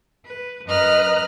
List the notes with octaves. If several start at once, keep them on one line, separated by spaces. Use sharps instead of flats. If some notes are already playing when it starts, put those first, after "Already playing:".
B4
F#2 B4 D#5 A#5 F6 F#6